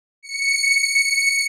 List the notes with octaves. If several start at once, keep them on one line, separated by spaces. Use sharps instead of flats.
C#7